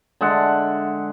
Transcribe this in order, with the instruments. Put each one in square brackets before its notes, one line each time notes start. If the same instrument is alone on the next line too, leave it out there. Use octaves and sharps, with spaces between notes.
[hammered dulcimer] D3 G#3 E5 F#5